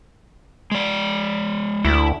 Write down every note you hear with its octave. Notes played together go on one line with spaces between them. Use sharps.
G#3 D5
D2 E4